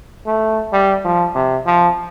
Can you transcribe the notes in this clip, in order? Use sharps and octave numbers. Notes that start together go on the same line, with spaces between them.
A3
G3
F3
C3
F3